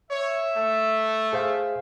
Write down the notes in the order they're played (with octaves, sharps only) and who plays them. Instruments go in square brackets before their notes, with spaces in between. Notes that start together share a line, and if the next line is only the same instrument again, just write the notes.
[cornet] C#5 [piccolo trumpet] E5
[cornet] A3
[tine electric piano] G#4 C5 F5